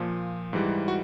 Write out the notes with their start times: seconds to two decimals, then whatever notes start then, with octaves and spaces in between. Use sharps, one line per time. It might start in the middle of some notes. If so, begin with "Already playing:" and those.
Already playing: A#2 F3
0.53 G#2 E3 G3
0.88 F#4